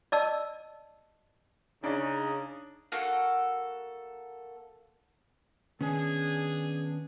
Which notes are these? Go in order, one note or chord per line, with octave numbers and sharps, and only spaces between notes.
D5 D#5 A5 E6
C#3 D4 D#4
A#3 F#4 A4
D#3 B3 C#4 D4 G#4